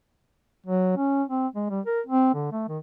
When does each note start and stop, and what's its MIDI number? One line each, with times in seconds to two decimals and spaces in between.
0.66 0.92 54
0.97 1.23 61
1.28 1.47 60
1.55 1.66 56
1.70 1.81 55
1.86 2.00 70
2.06 2.33 60
2.34 2.51 50
2.52 2.63 57
2.68 2.78 51